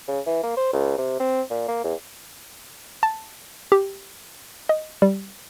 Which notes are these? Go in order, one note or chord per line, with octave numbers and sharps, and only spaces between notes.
C#3
E3
A#3
C5
C#2
C3
C4
A#2
A#3
E2
A5
G4
D#5
G3